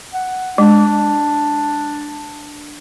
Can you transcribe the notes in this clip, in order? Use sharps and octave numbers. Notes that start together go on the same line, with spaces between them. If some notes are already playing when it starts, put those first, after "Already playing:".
F#5
G#3 D4